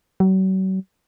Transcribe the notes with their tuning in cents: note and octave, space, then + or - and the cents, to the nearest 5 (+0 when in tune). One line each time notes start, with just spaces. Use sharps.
F#3 +40